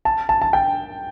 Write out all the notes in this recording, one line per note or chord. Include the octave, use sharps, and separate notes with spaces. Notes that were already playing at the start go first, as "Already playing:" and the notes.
A5
A5
A5
G5